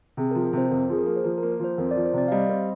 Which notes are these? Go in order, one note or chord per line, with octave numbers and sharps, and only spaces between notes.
C3 G#4
F3 A#4
A#4
C3 C5
F2 A#4
F3 G#4
A#4
A#3
C5
F3 A#4
A#4
A#3
A#4
F3 C5
F2 A#4
D5
F3
C5
C3 D5
F5
G3 D#5
C4